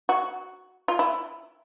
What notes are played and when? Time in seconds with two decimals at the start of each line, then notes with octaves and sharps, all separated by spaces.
0.09 F#4
0.88 F4
0.99 E4